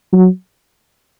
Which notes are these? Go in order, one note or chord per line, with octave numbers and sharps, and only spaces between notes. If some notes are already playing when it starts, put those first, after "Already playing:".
F#3